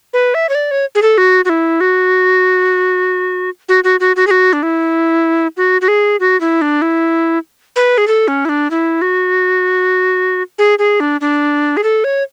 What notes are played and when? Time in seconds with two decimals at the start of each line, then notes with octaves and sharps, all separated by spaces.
0.14 B4
0.34 E5
0.49 C#5
0.55 D5
0.71 C#5
0.95 G#4
1.02 A4
1.18 F#4
1.45 F#4
1.49 E4
1.81 F#4
3.69 F#4
3.84 F#4
4.00 F#4
4.16 F#4
4.27 G#4
4.31 F#4
4.53 D4
4.63 E4
5.57 F#4
5.81 F#4
5.88 G#4
6.20 F#4
6.41 E4
6.62 D4
6.82 E4
7.76 B4
7.98 G#4
8.08 A4
8.28 C#4
8.45 E4
8.49 D4
8.71 E4
9.02 F#4
10.59 G#4
10.79 G#4
11.00 D4
11.21 D4
11.77 G#4
11.84 A4
12.04 C#5